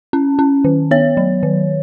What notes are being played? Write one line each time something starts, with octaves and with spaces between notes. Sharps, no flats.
C#4
C#4
D#3
B3 C#5
F#3
D#3